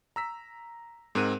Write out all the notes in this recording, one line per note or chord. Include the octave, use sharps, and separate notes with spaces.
A#5 E6 B6
G#2 C4 A#4 F#6 D#7